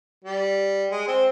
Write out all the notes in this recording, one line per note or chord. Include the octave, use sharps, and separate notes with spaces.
G3
G#3
C4